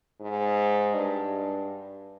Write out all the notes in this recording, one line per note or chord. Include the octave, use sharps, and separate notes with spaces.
G#2
G2